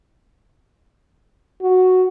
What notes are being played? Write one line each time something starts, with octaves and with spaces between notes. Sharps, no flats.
F#4